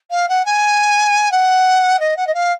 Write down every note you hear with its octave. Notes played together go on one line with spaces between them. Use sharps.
F5
F#5
G#5
F#5
D#5
F#5
D#5
F5